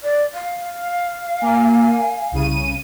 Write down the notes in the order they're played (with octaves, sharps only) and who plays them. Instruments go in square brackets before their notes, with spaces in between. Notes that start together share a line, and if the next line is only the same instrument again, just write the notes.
[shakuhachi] D5
F5
[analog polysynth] A#3 [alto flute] G#5
[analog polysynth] C2 C#3 D#7